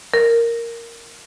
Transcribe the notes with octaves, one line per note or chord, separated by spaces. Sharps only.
A#4